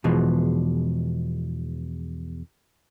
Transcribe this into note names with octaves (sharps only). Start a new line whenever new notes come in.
E2 B2 E3 F3 G#3